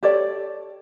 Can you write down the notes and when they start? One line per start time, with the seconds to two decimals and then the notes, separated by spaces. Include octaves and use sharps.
0.03 G4 A4 C#5 D5